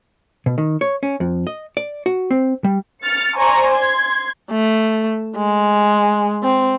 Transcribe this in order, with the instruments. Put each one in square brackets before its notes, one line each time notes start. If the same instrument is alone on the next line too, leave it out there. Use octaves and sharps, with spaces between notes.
[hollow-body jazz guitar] B2
D#3
C#5
C#4
F2
D#5
D5
F#4
C4
G3
[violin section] F6 A6 C#7
C5 D5 G#5 A#5 C#6
C6 G#6
[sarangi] A3
G#3
C4